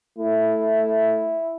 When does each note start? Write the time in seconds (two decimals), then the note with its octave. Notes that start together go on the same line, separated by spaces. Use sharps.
0.19 A3 E4